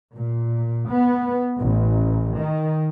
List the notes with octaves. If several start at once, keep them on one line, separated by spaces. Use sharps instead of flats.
A#2
B3
A1
D#3